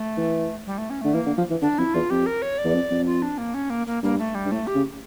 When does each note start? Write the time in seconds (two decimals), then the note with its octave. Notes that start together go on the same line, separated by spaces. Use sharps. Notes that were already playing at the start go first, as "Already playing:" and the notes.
Already playing: A3
0.18 E3
0.66 G3
0.78 A3
0.90 C#4
1.01 D3 A3
1.13 E3 A#3
1.26 D3
1.38 F3
1.50 E3
1.61 D3 D4
1.78 F2 E4
1.94 E2 F4
2.10 F2 G4
2.26 A#4
2.42 C#5
2.58 D5
2.65 E2
2.74 F2
2.91 F2
3.06 F4
3.22 D4
3.38 A#3
3.54 C#4
3.70 A#3
3.87 A#3
4.03 G2 A#3
4.18 A3
4.35 G3
4.46 G2
4.51 A2 A3
4.67 G4
4.75 C#3